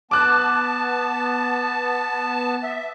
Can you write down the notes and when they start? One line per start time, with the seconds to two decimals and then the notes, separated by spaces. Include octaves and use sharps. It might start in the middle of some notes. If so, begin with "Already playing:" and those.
0.11 B3 A5 D6 F#6
2.63 E5